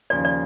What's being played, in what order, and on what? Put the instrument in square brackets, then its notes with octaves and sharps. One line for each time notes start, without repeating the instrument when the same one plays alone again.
[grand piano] D#2 C#3 F3 [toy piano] D5
[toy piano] D5